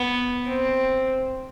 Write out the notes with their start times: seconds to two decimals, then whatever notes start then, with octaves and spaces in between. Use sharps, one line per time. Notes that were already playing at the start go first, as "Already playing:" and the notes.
Already playing: B3
0.48 C4